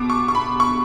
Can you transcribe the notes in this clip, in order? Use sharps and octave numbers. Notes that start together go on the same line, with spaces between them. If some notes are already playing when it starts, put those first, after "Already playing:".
Already playing: B2 D6
C#6
C#6
B5
C#6